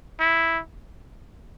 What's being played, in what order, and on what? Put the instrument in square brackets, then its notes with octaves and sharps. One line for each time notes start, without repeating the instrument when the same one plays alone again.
[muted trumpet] E4